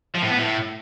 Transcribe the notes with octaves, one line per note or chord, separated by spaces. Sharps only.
F3
A2
B3
A2